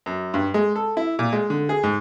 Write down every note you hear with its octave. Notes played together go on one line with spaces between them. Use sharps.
F#2
G2
G#3
A4
E4
A#2
G#3
D3
G#4
G#2